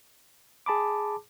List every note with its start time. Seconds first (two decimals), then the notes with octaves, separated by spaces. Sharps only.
0.66 G#4 A5 B5 D6